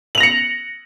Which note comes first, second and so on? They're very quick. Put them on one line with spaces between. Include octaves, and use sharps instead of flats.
F#7 F7 A#6 C#7